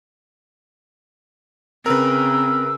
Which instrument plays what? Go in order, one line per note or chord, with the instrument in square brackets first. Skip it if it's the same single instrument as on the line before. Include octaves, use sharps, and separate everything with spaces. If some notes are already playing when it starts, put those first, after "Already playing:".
[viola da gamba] C#3 [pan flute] C4 [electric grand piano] A#4 B4 [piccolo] E6